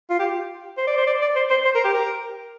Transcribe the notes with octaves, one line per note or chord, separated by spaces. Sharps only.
F4
G4
C5
D5
C5
D5
D5
C5
C5
C5
A#4
G4
A#4